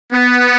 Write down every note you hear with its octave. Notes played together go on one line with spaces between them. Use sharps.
B3